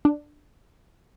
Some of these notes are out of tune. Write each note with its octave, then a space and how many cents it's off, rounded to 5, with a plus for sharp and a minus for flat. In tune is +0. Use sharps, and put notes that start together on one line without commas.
D4 +10